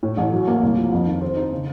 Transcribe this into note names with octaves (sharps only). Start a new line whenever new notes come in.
A2
A1
F#3
A#3
C2
F3
F2
D#3
C4
D#4
C#3